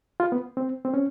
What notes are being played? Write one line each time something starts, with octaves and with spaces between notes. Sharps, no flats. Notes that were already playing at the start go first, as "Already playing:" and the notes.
F4
B3
C4
C4
C#4